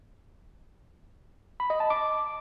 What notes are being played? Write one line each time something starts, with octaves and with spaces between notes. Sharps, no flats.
B5
D#5
A5
D6